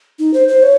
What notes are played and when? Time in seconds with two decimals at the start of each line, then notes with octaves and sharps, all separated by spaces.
0.19 D#4
0.34 C5
0.48 C5
0.63 C#5